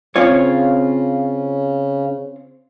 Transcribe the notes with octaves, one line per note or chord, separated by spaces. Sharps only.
C#3 C4 F4 C#5